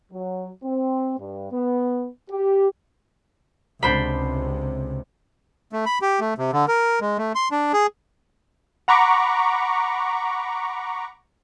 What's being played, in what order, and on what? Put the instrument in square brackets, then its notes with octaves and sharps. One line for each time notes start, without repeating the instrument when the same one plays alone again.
[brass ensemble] F#3
C4
G2
B3
G4
[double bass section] C#2 C3 [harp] D4 C5 B5
[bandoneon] A3
B5
G4
A3
C3
D3
A#4
G#3
A3
C6
D4
G#4
[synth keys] F#5 A#5 B5 C#6 D6